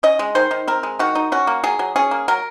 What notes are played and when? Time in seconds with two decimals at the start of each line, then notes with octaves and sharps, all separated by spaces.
0.03 C#4 D#5
0.19 G#3
0.35 D#3 C5
0.51 D#3
0.68 C4 A#4
0.83 G#3
0.99 D#3 F#4
1.15 D#4
1.32 C#4 F#4
1.47 A#3
1.64 F#3 G#4
1.79 F#3
1.96 C#4 G#4
2.11 A#3
2.28 F#3 A#4